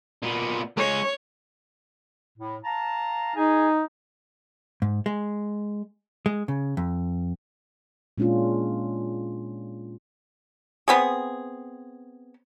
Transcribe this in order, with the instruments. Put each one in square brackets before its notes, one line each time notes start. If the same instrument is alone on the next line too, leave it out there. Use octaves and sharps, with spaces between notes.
[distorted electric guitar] A#2 B3
[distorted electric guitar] G#3 C#4 [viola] C#5
[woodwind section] A2
F5 A5 A#5
[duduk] D#4 [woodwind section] G#4 D#5 G#5
[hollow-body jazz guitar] G#2
G#3
G#3
C#3
F2
[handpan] A#2 G#3 C#4 D4 F4
[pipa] B3 C4 G#4